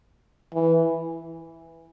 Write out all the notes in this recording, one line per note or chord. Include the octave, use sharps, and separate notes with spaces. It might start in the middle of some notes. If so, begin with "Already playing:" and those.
E3